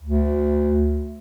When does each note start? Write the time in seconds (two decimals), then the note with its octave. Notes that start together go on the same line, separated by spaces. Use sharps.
0.03 D2